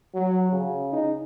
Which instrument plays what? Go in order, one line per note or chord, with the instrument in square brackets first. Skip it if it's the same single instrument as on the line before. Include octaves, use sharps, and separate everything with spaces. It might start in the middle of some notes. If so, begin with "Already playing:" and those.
[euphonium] F#3
C#3
D#4